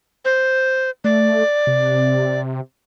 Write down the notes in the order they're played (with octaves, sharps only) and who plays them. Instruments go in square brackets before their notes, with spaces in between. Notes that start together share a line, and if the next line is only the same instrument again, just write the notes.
[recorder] C5
[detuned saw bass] A3 [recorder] D5
[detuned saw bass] C3